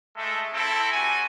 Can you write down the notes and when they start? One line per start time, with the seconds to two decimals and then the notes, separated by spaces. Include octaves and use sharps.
0.15 G#3 A3 A4 E5
0.53 C4 E4 A4
0.91 G3 F#4 G#5